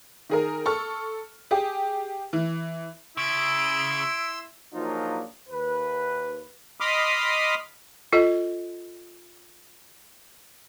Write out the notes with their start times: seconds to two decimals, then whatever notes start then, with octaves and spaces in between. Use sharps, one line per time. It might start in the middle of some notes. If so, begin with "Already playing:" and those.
0.30 D#3 G#4 A#4
0.66 A4 C#6 F6
1.51 G4 G#4
2.33 E3
3.17 C#3 E4 C6 E6 D7
4.74 A#1 A#2 F3 F#3 D#4 F4
5.50 D#2 B4
6.80 D#5 B5 C6 D6 D#6 F6
8.13 F4 A4 D#5